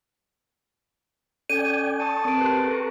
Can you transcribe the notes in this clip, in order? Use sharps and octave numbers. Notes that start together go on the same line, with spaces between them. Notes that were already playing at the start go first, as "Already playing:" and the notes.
C#4 A4 D5 G5 G#5 D#7
A5 C#6 D#6
C4 A#4 D7
G4 B4 C6 F#6
A4 A#5 C#6